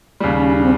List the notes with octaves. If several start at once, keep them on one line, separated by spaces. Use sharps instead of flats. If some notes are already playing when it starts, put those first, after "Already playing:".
D#2 C#3 G3
C#4
C#4
C4